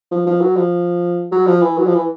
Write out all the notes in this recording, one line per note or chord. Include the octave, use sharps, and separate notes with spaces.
F3
F3
F#3
F3
F#3
F3
E3
F#3
F3
E3